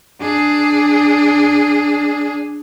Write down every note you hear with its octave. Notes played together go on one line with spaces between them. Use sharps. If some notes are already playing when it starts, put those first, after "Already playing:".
D4 G#4